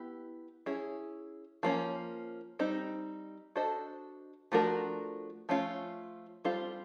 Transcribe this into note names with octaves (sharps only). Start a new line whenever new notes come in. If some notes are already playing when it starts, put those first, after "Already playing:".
Already playing: B3 E4 G4
C#4 E4 G#4
F3 A#3 C#4
G3 C4 D#4
D4 F#4 A4 C5 D#5
F3 A3 D4 F#4 A#4
F3 A3 C#4 F4
G3 C4 F4 A4 C5